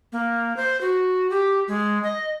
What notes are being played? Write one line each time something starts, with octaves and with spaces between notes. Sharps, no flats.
A#3
C5
F#4
G4
G#3
D#5